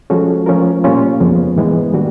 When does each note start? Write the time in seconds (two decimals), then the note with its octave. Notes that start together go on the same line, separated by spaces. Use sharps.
0.10 F3 G#3 C#4 F#4 A4
0.46 F3 A3 C#4 F4 A#4
0.84 A#2 G3 A#3 C#4 F4
1.20 F2 C#3 F3 G#3 B3
1.56 G#2 E3 G#3 B3
1.93 D#3 G3 A#3 D4 F#4